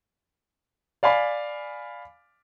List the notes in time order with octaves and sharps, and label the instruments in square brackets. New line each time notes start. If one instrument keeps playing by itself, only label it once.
[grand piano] D5 F5 G#5 B5